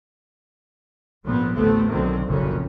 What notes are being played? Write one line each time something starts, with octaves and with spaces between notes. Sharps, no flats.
A#1 G#2 F3 B3 C4
A1 D2 A2 A3 B3 C4
B1 F#2 D3 D#3 C4
F#1 F2 A#2 C#3 C#4